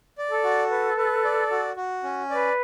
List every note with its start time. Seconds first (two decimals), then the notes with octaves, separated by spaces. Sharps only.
0.18 D5
0.31 A4
0.44 F#4
0.71 B4
0.97 B4
1.24 D5
1.50 F#4
1.77 F#4
2.03 C#4
2.30 B4 D5